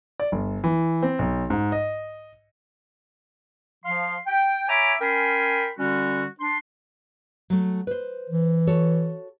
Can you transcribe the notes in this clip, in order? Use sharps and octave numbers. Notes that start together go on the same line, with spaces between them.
D5
G1
E3
C4
B1
G#2
D#5
F3 F5 C6
G5
C#5 E5 G#5 A#5 B5 D6
C#4 A#4 G5 G#5 B5 C6
D3 G3 C#4 F#4
D4 C6
F#3 A3
B4 C5
E3
F#4 A4 C#5